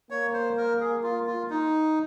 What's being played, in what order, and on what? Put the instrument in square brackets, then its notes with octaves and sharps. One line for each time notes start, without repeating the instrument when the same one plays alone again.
[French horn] A#3 [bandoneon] C#5
[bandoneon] C5
A#4
G#4
F4
F4
D#4